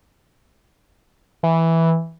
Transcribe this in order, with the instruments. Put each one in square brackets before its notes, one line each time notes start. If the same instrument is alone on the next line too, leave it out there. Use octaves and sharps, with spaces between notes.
[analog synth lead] E3